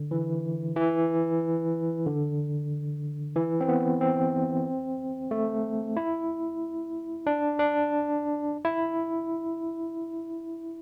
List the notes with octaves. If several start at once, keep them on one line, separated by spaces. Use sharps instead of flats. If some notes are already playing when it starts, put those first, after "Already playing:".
Already playing: D3
E3
E3
D3
E3
C4
B3
C4
A3
E4
D4
D4
E4